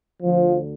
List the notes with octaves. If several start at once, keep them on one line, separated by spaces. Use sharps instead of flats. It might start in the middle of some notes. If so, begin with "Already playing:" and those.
D2 D3 F3